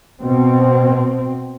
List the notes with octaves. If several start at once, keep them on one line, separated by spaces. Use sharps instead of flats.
B2 C4